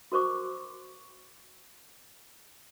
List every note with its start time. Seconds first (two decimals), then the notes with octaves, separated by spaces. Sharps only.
0.12 F#4 A#4 C5 C#6 D6